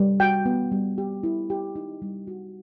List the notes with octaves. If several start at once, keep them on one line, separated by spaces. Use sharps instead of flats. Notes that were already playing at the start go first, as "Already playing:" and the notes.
Already playing: G3
F#4 G5
B3
G3
G4
E4
G4
D#4
G3
F#4